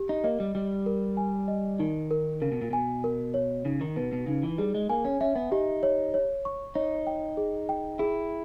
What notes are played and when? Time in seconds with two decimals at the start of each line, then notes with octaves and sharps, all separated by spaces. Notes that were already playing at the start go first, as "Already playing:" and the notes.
Already playing: G4
0.09 D#4
0.24 A#3 D#5
0.40 G3
0.55 G3 G4
0.86 A#4
1.17 G#5
1.48 D#5
1.79 D#3 D#4
2.11 A#4
2.42 C#3 A#4
2.52 B2
2.62 A#2
2.71 B2 G#5
3.04 A#4
3.34 C#5
3.65 C#3 D#4
3.81 D#3
3.96 B2 B4
4.13 B2
4.27 C#3 D#4
4.43 E3
4.58 G3 G#4
4.75 G#3
4.89 A#3 G#5
5.05 C#4
5.21 C#4 E5
5.36 B3
5.52 D#4 G4
5.83 C#5
6.14 C#5
6.45 C#6
6.75 D#4 C#5
7.07 G5
7.37 G#4
7.69 G5
7.99 E4 G#4